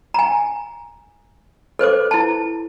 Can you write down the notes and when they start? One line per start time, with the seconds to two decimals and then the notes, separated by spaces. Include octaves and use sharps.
0.14 G#5 A#5
1.79 A4 B4 C5 D6
2.11 E4 A5